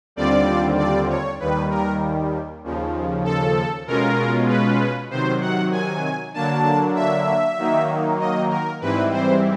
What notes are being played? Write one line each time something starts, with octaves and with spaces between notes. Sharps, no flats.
D#2 D3 G3 C4 F4 D5
D5
C#5
D#2 D#3 G3 B4
A#4
D#2 C#3 F3
A4
B2 G#3 C#4 F4 A#4
B4
C3 D#3 F#3 C5
F#5
G#5
D3 F#3 A#3 D4 A5
E5
D#3 F#3 A#3 D#4
D#5
A#4
G#2 E3 G3 C4 E4 B4
C5